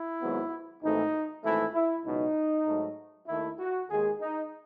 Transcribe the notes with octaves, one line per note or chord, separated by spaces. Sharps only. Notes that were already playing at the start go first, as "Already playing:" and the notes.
Already playing: E4
G#1 G#2 F#3 B3
G#1 G#2 E3 A3 D#4
G#1 G#2 E3 A3 E4
E4
C#2 B2 F#3 D#4
G#2 F#3 A3
D#2 D#3 A3 E4
F#4
D#2 D#3 G#3 G#4
D#4